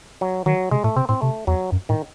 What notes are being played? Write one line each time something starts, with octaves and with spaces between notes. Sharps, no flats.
F#3
D#3 F#3
C3 G#3
A2 A3
C3 C4
A2 C4
C3 A3
E2 F#3
F#2
A2 D#3